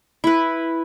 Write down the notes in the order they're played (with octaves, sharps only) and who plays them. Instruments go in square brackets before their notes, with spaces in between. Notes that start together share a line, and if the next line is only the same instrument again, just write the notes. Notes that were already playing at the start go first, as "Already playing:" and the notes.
[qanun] E4 B4